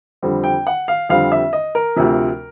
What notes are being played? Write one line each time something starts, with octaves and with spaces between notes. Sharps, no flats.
F2 D3 G3 C4
G5
F#5
F5
F2 D3 G3 C4 F5
E5
D#5
A#4
D2 C3 F3